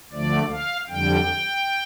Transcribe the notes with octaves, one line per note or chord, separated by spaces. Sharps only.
D2 D3 F3 A3 D5
F5
F2 D3 G3 G5